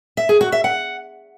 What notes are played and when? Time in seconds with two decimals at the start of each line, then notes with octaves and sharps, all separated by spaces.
0.17 E5
0.29 G#4
0.41 F#4
0.52 E5
0.64 F#5